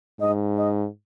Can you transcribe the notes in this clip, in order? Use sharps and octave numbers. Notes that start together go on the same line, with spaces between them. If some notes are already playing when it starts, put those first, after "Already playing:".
G#2 D#5
D#5